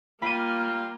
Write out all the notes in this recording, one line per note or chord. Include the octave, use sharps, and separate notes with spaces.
G3 A#3 F4 B5 D#7